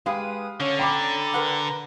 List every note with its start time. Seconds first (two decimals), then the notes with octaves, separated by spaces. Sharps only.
0.06 G#3 G4 B4 F5 D#6
0.60 D3 C#4 C#5
0.79 G5 A#5 B5 D6
1.34 A#4 B4 F#5